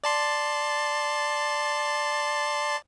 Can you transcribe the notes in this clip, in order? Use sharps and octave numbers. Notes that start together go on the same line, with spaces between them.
D5 A5 C6